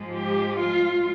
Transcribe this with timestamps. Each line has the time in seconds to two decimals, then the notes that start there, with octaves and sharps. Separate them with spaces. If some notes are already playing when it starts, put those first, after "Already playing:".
Already playing: G#2 F3 G#3
0.12 G4
0.57 F4